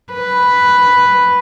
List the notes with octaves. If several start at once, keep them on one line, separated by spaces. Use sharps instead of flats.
B4